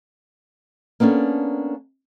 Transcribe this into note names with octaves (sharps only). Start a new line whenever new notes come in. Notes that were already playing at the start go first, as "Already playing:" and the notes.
A#3 B3 C#4 D4 A4